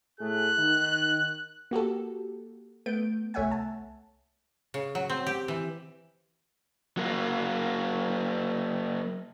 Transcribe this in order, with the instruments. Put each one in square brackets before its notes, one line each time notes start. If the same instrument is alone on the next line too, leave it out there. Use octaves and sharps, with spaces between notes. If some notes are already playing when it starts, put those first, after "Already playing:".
[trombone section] A2 A3 G#4 [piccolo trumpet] F#6
[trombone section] D#3 D#4
[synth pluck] A#3 F#4 G4 A4
A3 B3 G6 D7
C2 A3 C#5 E5 F#5 G#5
A5
[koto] C#3
F#3
C4
G4
E3
[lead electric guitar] F#3 A#3